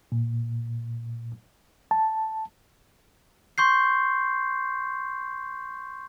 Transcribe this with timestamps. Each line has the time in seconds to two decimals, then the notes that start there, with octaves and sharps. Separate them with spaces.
0.12 A#2
1.91 A5
3.58 C6 C#6 G6 C7